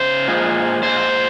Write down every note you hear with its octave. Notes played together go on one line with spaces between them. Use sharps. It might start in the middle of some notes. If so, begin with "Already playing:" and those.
Already playing: C#3 C5
A#2 F3 G#3
A#2 G#3 C5